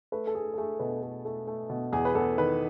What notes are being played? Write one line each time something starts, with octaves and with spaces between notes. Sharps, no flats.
A3 B4
A4
A3 G#4
A4
A3 G#4
B2 B4
A3
A3
A3
B2
E2 G#4
B4
E2 A4
D#3 B4